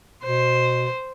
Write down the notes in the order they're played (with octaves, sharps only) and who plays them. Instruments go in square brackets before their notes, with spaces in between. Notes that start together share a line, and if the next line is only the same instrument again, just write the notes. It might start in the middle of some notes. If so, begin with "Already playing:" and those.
[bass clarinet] B2 [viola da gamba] C5